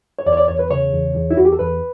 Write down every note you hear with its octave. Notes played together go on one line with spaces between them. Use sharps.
C#5
E2 D5
C#5
D5
E2 C#5
B4
C#3 C#5
E2
E2
E4
E2 F#4
G4
A4
E2 B4